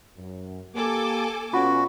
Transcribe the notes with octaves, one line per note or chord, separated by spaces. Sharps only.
F#2
A#3 G4 A4 G#5 D6
B2 C#4 F4 F#4 B5 C#6